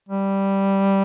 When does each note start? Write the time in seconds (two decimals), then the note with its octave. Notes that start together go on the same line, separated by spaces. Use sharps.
0.09 G3